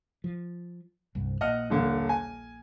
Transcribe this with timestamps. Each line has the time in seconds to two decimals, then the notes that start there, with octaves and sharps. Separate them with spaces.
0.24 F3
1.15 C2 G2
1.41 A#1 A#2 D#5 F#5 F6
1.70 D#1 D3 A#3
2.09 G#5